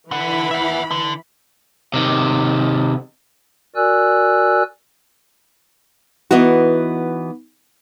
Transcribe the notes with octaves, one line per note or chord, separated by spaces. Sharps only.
D3 E3 F#5 B5
E5 F#5
D3
C3 D#3
F#4 A#4 D5 G#5 E6 F#6
E3 B3 D#4 E4 F#4